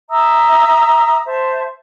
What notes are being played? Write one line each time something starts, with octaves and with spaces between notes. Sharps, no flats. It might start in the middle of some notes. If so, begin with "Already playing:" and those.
E5 A#5 D#6 E6
C5 E5 A5